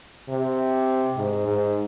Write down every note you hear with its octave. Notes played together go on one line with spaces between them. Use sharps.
C3
G#2
G#2